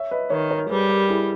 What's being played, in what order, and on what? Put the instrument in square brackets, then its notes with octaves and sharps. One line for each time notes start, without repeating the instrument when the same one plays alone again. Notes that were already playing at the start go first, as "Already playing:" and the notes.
Already playing: [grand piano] C#5 E5
B4 D#5
[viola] D#3 [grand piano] A#4 C#5
[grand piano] A#4 C#5
[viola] G3 [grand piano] G#4 B4
[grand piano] G4 A#4
E4 G#4